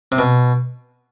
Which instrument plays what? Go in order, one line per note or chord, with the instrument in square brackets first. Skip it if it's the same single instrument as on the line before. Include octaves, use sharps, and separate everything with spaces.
[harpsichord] C3
B2